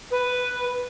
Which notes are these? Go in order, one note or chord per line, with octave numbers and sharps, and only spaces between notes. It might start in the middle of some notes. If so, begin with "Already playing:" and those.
B4